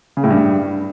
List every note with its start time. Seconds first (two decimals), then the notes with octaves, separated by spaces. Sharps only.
0.17 C#3
0.24 A2
0.30 G2